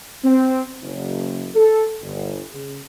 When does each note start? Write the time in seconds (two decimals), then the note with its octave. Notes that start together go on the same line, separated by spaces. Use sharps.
0.24 C4
0.82 F#1
1.54 A4
2.01 G1
2.53 C#3